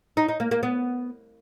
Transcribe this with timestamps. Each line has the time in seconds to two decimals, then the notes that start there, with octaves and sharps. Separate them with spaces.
0.17 D#4
0.29 D#4
0.40 A#3
0.51 A#3
0.63 B3